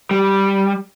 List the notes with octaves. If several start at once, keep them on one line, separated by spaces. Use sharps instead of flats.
G3